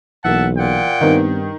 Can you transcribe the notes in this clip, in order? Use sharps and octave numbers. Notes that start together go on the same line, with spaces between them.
B1 E3 A#3 E5 F#5 A5
A#2 F#5 G5
G2 D#3 B3 C4 D#4